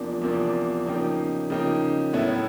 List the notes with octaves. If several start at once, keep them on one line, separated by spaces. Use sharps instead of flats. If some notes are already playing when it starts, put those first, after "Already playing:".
Already playing: E2 C3 F3 A#3 D4
E2 C3 F3 A#3 D4
C#3 F3 A#3 D#4 G4
C#3 F3 A#3 D#4 G4
A2 F#3 B3 E4 A4